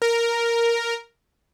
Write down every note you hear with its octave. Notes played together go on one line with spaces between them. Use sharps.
A#4